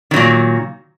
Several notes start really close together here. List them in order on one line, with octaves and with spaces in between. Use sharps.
D#3 F#3 A#2